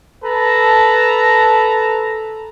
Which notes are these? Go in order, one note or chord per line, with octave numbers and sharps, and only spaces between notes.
A4 B4 A5 A#5